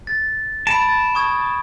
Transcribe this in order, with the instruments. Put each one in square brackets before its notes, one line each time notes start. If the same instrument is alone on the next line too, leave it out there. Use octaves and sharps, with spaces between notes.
[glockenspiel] A6
[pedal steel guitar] A5 [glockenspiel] B5 D7
[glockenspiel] C#6 D#6 G#6